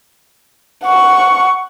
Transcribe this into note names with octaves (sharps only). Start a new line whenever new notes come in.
F#5 C#6